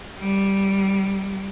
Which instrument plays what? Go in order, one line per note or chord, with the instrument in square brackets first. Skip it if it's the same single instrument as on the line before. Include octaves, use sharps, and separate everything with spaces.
[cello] G3